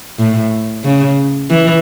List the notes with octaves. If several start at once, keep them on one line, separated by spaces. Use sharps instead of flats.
A2
C#3
E3